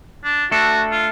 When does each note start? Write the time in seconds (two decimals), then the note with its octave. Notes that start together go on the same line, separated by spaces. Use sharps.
0.24 D4
0.51 A3 D4 F#4 A4
0.92 F4